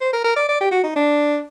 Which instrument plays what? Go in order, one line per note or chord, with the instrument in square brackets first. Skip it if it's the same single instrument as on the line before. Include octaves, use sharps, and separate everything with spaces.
[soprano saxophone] C5
A#4
A#4
D5
D5
G4
F#4
D#4
D4